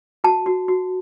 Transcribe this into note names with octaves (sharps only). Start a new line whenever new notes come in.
F#4 A5
F#4
F#4